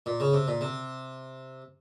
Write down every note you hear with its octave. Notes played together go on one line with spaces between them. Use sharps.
A#2
C#3
C3
A#2
C3